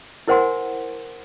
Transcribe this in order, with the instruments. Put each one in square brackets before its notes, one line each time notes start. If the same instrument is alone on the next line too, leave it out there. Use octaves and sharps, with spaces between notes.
[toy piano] E4 A#4 C5 F#5 G#5 C6